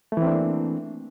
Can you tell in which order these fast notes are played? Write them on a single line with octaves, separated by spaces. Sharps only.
A3 E3 C4 D4 A#3